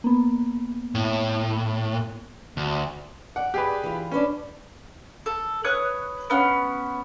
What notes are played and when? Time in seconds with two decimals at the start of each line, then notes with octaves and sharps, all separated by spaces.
0.04 A#3 B3
0.95 A2
2.57 D2
3.36 D5 F#5
3.54 G4 G#4 B4
3.84 E3 F4
4.12 C#4 D4 B4 C#5
5.26 A4
5.64 B4 C#5 D#6 F#6
6.30 B3 C#4 F#5